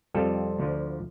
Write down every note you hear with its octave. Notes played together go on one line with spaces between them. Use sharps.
F2 C3 G3 F4 A4
D2 D3 F3